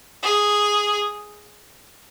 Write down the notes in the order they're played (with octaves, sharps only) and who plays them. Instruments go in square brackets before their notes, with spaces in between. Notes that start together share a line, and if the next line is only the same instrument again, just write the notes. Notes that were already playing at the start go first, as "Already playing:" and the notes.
[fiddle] G#4